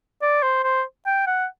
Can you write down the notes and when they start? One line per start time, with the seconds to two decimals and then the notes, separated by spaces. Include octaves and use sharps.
0.22 D5
0.43 C5
0.63 C5
1.06 G5
1.27 F#5